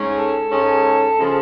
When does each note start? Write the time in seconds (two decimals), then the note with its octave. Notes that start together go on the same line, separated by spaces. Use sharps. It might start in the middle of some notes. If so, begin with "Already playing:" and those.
Already playing: G#2 G#3 C#4
0.16 A4
0.50 G#2 G#3 C#4
1.17 C#3 F3 G#3